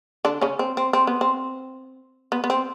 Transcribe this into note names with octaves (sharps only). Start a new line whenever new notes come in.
D3 D4
C#3 C#4
C4
C4
C4
B3
C4
B3
B3
C4